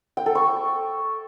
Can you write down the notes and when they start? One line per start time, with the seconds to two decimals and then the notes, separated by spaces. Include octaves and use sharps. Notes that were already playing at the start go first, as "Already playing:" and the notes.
0.17 G5
0.26 A4
0.35 C#6